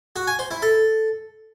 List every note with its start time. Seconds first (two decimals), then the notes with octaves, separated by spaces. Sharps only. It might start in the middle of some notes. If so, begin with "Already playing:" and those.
0.16 F#4
0.27 G#5
0.39 C5
0.51 E4
0.62 A4